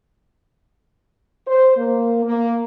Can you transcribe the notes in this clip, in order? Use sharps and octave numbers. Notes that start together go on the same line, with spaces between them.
C5
A#3
A#3